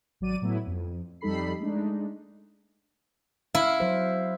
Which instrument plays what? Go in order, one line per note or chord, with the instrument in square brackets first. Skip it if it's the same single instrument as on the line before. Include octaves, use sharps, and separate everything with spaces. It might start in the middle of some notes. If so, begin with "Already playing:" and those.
[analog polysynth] G#1 F#3 D5 D#7
A2 F#3 A3 B3 E4
F2
F2 G3 D#4 A4 B5 C7
G#3 A3 D4 D#4
[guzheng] E4 [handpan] F5
[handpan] F#3 C5